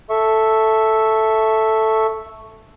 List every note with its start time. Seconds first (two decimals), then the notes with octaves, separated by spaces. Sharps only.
0.10 A4 E5 C#6